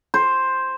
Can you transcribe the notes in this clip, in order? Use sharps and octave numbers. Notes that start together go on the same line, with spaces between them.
C5